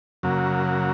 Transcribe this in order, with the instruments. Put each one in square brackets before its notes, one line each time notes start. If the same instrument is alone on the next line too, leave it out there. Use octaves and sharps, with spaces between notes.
[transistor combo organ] F#2 C#3 F#3 A#3